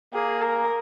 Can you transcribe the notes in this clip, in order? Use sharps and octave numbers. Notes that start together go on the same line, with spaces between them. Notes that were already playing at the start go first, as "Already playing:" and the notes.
A#3 G#4
A#4